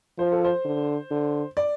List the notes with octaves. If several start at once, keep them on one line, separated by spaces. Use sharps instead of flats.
F3 C5
A4
C5
D3
D3
D5